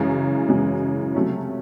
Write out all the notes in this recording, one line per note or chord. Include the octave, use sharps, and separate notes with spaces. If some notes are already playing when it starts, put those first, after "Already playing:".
Already playing: F#2 C#3 E3 G#3
F#2 C#3 E3 G#3
C3 F#3 A3 C#4